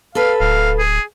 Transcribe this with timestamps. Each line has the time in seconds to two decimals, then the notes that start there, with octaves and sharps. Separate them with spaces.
0.15 A4 B4 F5
0.40 D1 F5
0.79 G#4